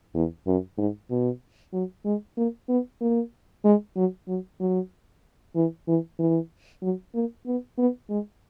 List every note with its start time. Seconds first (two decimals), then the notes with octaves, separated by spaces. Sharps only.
0.15 E2
0.47 F#2
0.78 G#2
1.10 B2
1.73 F#3
2.05 G#3
2.37 A#3
2.69 B3
3.01 A#3
3.65 G#3
3.96 F#3
4.28 F#3
4.60 F#3
5.56 E3
5.88 E3
6.19 E3
6.83 F#3
7.15 A#3
7.47 B3
7.78 B3
8.10 G#3